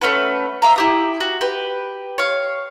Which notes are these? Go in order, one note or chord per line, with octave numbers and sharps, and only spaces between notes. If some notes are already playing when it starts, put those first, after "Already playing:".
A3 C#4 F#4 B4
E5 F5 A#5
E4 G4 D#6
F#4
G4 B4
C#5 F5